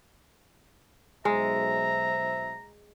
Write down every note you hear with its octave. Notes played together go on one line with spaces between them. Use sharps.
B1 G#3 C5 E5 A#5